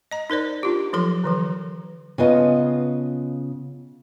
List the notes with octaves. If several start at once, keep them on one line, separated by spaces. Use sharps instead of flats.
D#5 A#5
D#4 A#4 C5 D5
D4 F4 G4
F3 F#3 A4 C6
D3 E3 F#3
C#3 B3 F4 D#5 A5